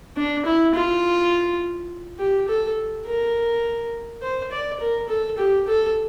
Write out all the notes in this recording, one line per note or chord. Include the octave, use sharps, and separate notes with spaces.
D4
E4
F4
G4
A4
A#4
C5
D5
A#4
A4
G4
A4